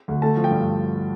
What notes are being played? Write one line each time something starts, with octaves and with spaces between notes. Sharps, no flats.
D2
A3 A5
F3
G5
G2